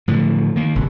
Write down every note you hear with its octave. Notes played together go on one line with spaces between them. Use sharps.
A2 D3 F3
D#3 A#3
D#1 G#1 C3